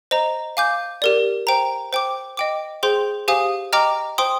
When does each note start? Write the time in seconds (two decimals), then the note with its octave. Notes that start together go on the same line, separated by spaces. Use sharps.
0.11 C5 D#5 A#5
0.57 F5 G#5 D6 G6
1.02 G4 A#4 D5
1.47 C5 G5 A#5
1.93 C5 G5 D6
2.37 D#5 G5 D6
2.83 G#4 C5 G5 C6 G6
3.28 G4 C5 F5 G#5 D#6
3.73 D#5 G5 A#5 D6 F6
4.18 C5 G5 C6 D#6